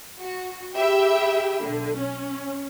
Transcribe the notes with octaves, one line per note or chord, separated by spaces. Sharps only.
F#4
G4 G#4 E5 G5 B5
B1 D3
C#4